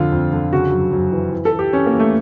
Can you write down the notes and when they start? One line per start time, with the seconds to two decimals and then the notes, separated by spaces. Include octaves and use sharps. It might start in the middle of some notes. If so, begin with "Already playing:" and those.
Already playing: F2 D3 F4
0.12 F2
0.33 D3
0.53 C#3 F#4
0.72 F#2
0.92 F#2
1.12 E3
1.32 E3
1.45 A4
1.52 E3
1.59 G4
1.72 E3 C#4
1.86 A#3
1.93 E3
2.00 A3